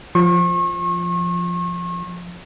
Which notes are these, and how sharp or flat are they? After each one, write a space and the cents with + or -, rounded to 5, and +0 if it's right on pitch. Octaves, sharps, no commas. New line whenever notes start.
F3 +0 C#6 -35